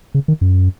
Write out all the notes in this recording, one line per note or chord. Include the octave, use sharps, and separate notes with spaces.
C#3
D#3
F#2